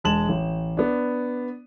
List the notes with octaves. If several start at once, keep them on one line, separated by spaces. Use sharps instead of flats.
E1 G#3 A5 E7 F#7
A1
B3 D4